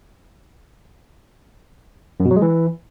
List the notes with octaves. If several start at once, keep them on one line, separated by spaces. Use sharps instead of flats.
F#2
B2
F#3
G#3
E3